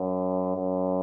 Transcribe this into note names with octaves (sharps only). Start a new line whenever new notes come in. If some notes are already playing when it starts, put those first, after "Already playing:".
Already playing: F#2
F#2